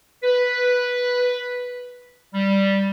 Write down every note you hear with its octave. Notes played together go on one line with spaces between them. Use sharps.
B4
G3